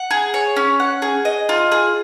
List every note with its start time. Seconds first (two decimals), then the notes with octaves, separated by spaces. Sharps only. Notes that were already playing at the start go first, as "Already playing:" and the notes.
Already playing: F#5
0.11 G#4
0.34 C#5
0.56 C#4
0.80 F#5
1.02 G#4
1.25 D#5
1.49 F4
1.72 G#4